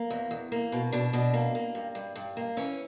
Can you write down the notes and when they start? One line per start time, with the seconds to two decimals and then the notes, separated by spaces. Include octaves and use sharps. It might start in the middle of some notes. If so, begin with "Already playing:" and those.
Already playing: A#3
0.10 E2
0.31 E2
0.52 A#3
0.72 B2
0.92 B2 D4
1.13 B2
1.34 A#3
1.55 A#3
1.75 G2
1.95 G2
2.15 G2
2.37 A#3
2.57 E3 C#4